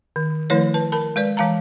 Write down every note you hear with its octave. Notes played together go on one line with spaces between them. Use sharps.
D#3
D#3 F3 A3 E4 B4 C#5
B4 A5
A#4 A5 B5
G#3 B4 D5
E3 G#3 F5 A5 A#5